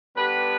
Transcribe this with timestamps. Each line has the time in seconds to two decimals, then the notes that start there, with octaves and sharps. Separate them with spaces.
0.16 D3 G3 B3 G4 B4